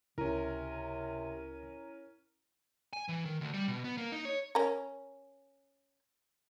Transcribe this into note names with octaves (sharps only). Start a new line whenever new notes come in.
C#2 C3 C#4 E4 A#4 A#5 D#7
G#5
E3
D#3
D2
G3
B2
B3
A#3
D#4
C#5
C#4 A#4